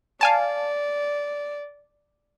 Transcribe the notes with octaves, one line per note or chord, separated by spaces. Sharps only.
D5 F5 G#5 A5